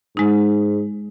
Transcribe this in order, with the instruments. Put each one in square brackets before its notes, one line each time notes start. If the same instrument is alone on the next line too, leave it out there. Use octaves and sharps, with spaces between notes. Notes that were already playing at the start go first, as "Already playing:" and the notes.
[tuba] G#2 [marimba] G#3 D#4